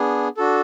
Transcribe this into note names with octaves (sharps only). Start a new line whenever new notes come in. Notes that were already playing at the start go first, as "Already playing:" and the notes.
Already playing: B3 D4 G#4
D4 F#4 A4